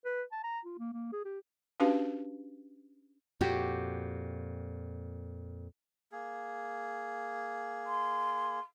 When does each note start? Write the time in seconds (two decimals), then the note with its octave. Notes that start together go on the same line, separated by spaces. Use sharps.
0.05 B4
0.32 A5
0.44 A#5
0.65 F4
0.78 A#3
0.93 A#3
1.12 G#4
1.25 G4
1.80 C#4 D4 F#4 G4 B4 F5
3.41 F2 A#2 F#4 G4
6.12 A#3 G#4
7.86 C6